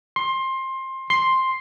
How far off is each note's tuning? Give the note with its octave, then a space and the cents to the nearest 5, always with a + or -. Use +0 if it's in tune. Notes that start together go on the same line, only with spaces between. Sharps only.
C6 +20
C6 +5